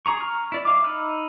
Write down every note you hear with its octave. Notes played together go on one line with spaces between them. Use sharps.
G#4 A#5 C#6
A#5 C#6 F6
E4 D5
E5 F5 D6
D#4 B5 E6 F6